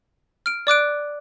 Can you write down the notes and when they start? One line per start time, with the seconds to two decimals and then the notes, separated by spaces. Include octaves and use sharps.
0.46 F6 D7
0.67 D5 D6 F#6 D7